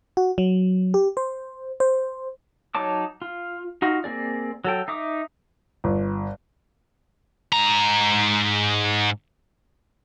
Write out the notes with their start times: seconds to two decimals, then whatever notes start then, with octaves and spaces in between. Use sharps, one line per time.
0.17 F#4
0.38 F#3
0.94 G4
1.17 C5
1.80 C5
2.75 F#3 D#4 C#5 A5 D6
3.22 F4
3.82 D#4 F4 F#4
4.04 A#3 C4 G#4 D5
4.65 F#3 A4 G5
4.88 D#4 E5 D6 D#6
5.84 G1
7.53 G#2 A#5